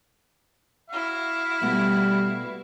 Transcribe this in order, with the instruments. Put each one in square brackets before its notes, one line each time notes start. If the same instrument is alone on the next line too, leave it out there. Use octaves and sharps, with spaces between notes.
[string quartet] E4 F#4 [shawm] F5
[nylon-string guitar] B2 A3 B3 [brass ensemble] G3